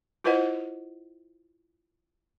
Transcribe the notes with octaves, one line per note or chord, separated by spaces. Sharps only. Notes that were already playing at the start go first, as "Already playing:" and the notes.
E4 F4 B4 C5 D#5 F#5